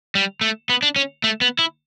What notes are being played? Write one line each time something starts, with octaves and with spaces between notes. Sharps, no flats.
G3
A3
B3
D4
C#4
A3
B3
E4